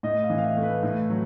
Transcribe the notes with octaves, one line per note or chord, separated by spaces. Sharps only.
A2 D#5
F5
E3
F5
E5
A3
B4
A2
F#3